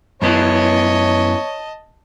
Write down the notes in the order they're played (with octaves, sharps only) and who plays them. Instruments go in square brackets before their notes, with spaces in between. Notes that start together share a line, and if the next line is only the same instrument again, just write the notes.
[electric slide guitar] F#2 B3 E4 [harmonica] C#5 [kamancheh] D#5 A5